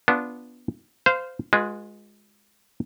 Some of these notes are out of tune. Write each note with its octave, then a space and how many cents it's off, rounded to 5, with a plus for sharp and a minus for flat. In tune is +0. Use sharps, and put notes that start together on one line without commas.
B3 -10 D4 -15 F4 -15
C5 -20 F5 +0
G#3 +0 F4 +40 B4 -20